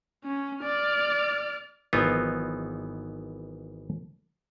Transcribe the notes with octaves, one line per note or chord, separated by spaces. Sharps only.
C#4
D5 F6
G#1 E3 F#3 B3 D#4 F4